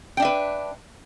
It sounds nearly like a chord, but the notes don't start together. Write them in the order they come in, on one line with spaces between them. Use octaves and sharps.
G5 D4 E5 B4